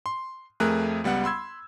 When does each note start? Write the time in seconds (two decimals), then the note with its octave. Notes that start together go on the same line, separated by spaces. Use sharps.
0.06 C6
0.60 F2 A3 G#4 A#4 F#6
1.04 C#2 G3 B3 F#5
1.24 B5 C6 E6 G#6